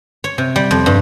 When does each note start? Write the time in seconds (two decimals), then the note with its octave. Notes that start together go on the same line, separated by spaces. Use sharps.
0.24 C#5
0.38 C3
0.56 G3
0.71 F2
0.86 G2